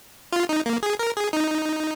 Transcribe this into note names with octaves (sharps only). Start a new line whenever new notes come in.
F4
D#4
A#3
G#4
A#4
G#4
D#4